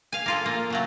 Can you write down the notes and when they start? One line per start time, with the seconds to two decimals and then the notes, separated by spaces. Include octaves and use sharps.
0.12 F5 G#5
0.26 A#3 F4 A4
0.46 A#3
0.70 C#3 F#3 A3